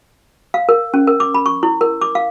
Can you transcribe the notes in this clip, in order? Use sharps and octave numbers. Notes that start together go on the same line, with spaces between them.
F5
A#4
C#4
A#4
D6
B5
C#6
E4
A#4
D6
F5